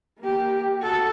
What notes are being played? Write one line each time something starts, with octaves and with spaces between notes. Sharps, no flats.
A#3 G4
F#4 A4